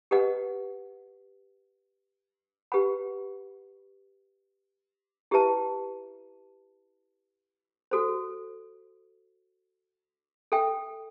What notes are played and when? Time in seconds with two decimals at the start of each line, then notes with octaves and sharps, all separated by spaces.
0.11 G4 B4 D#5 F#5
2.72 G4 B4 F#5 B5
5.31 E4 G4 B4 E5 A5
7.91 F#4 A4 C5
10.52 A4 E5 G5